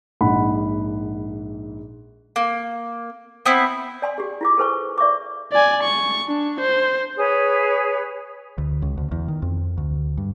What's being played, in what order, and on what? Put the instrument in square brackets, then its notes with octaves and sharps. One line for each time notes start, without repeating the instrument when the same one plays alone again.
[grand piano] A#1 G#2 F#5 B5
[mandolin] A#3
B3 C4 E4
[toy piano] D5 G#5 C6
G4 G#4
E4 F4 D6
G#4 A4 B4 C5 G#5 C#6
D5 E5 C#6 D6
[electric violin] D5 G#5
C#6
D4
C5
[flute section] G#4 B4 C#5
[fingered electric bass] D2
C#2
D2
E2
D#3
F2
D2
G2